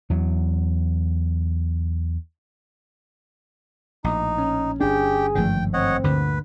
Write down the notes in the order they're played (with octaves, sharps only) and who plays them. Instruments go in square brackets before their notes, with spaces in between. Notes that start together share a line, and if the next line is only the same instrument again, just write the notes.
[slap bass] E2 F#3
[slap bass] A#1 A2 [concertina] D#4
[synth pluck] C#4
[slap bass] G1 D4 [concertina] G4 G5 [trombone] G#4
[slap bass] G#1 D3 [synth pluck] G2 F3 A3 [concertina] G5
[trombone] C4 [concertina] C#5 D#5 F#5
[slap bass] D2 G2 A#2 [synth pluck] D3 [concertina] B4